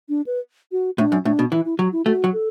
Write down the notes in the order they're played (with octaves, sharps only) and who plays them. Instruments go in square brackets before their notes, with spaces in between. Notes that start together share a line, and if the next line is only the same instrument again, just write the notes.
[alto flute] D4
B4
F#4
[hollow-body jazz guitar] A2 [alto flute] D4
[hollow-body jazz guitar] F#2
[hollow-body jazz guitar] A2 [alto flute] D4
[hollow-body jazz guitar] B2
[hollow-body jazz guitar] E3 [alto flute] E4
[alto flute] E4
[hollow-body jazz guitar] F#3 [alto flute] F#4
[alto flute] E4
[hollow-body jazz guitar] A3 [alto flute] F#4
[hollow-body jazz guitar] F#3
[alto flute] A4